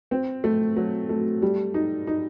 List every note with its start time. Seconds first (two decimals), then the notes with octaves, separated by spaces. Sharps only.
0.11 C4
0.44 A3
0.76 F#3
1.09 A3
1.42 G3
1.74 D#4
2.07 D#4